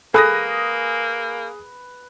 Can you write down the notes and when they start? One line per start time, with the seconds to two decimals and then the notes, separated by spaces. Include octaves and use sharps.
0.14 A#3 G#4 A4 B4 D#6 A#6